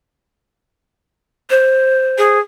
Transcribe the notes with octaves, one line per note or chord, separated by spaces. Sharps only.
C5
G#4